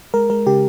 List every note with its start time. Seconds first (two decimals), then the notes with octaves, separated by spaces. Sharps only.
0.14 G#3 A#4
0.30 G#3 A#4
0.46 C#3 G4